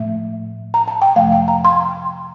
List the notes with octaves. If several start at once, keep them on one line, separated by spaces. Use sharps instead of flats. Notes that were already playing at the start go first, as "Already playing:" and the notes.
Already playing: A2 F3 A3 E5
A#5
A5
G5
F2 C3 F3 A3 F5
G5
A#5
C6